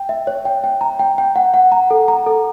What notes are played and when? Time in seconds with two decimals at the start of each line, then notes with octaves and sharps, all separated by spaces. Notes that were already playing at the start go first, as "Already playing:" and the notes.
Already playing: G5
0.09 E5
0.27 C#5
0.45 G5
0.64 G5
0.81 A#5
0.99 G5
1.18 G5
1.36 F#5
1.54 F#5
1.72 A#5
1.91 A4
2.08 A#5
2.26 A4